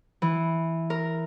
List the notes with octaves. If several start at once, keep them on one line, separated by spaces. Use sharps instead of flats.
E3
A#4